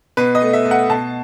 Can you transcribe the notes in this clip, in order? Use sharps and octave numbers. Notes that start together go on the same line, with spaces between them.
B2 B4
D#5
A3
E5
A3
F#5
B2 A5